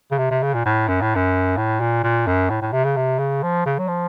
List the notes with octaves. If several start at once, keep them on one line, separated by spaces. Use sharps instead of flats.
C#3
C3
C3
C#3
A#2
A2
F#2
A2
F#2
A2
A#2
A#2
F#2
A2
A2
C3
C#3
C3
C#3
F3
C#3
F#3
F3